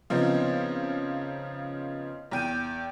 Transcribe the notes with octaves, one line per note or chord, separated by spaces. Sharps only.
C#3 F3 B3 C4 D#4
E2 G5 D#7